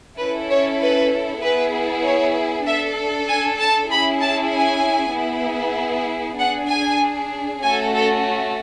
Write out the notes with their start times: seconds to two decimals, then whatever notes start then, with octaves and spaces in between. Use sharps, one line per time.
0.18 C#4 E4 A4 B4
0.49 C#5
0.81 B4
1.42 B3 E4 G#4 B4
2.04 C#5
2.67 D4 A4 E5
3.28 G#5
3.59 A5
3.90 C#4 E4 G#4 B5
4.21 A5
4.52 G#5
5.15 B3 E4 G#4
6.38 D4 G#4 F#5
6.69 G#5
7.61 A3 C#4 F#4 A4 G#5
7.93 A4